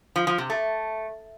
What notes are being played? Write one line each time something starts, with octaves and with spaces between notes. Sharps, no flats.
F3
F3
C3
A3